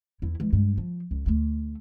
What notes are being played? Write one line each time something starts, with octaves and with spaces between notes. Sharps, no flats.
E2 E4
E3 G#3
G2 G#3
F3
C#2
D2 A3